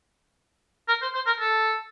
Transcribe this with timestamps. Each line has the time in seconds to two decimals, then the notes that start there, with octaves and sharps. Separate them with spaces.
0.88 A#4
1.02 C5
1.14 C5
1.26 A#4
1.40 A4